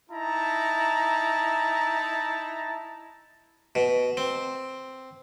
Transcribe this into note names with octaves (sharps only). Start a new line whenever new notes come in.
D#4 E4 A5 A#5
B2
C4